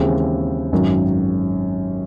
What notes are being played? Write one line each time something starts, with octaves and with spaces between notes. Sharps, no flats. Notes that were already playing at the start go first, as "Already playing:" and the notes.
Already playing: D#2 C#3 E3 G#3 C4
G#1 F#2 D#3